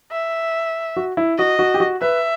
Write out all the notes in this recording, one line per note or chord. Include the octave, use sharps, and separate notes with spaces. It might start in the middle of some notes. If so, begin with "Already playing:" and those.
E5
F#4
E4
F#4 D#5
F#4
G4
F#4
B4 E5